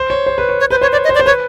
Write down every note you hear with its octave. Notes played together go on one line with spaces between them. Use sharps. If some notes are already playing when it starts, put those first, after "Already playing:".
Already playing: C5
C#5
C5
B4
C#5
C#5
B4 C5
C5 C#5
C#5 D5
D#5
C5
D5
C5
B4 C#5